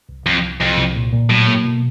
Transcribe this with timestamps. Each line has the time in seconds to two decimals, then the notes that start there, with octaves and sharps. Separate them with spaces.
0.09 C2
0.26 C2 F2
0.43 C2
0.60 C2 F2
0.77 C2
0.95 A#2
1.12 A#2
1.30 A2 F#3
1.48 A#3
1.64 B2